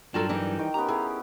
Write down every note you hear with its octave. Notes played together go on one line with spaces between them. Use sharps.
G2 F#3 D4 F4 F#4 A4 A#4 G5
E3 G3 D#4
D#3 G5
B3 C#4 G4 A#5
E4 G#4